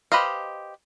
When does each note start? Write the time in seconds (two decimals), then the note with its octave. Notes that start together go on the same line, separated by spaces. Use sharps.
0.12 G4 B4 C5 D#5 F5